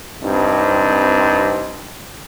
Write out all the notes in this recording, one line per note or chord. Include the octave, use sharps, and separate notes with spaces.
C2 G2 C4 D#4